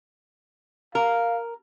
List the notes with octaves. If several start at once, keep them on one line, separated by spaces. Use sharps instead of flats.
A#4 F5